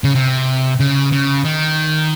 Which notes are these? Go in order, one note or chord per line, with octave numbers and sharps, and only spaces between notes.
C#3
C3
C#3
C#3
D#3